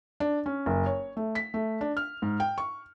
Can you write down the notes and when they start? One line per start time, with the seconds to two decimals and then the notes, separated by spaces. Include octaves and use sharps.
0.20 D4
0.46 C#4
0.66 F#1
0.86 C#5
1.17 A3
1.35 B6
1.54 A3
1.81 D4
1.97 F6
2.22 G#2
2.40 G5
2.58 C#6